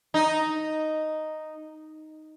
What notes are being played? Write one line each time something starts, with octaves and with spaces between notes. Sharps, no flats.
D#4